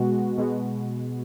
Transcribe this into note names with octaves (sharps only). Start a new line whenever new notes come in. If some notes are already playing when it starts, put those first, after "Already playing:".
Already playing: B2 G#3 B3 F#4
B2 G#3 B3 F#4